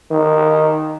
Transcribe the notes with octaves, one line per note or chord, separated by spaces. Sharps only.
D#3